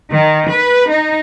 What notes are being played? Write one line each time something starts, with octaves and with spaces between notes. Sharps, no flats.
D#3
B4
D#4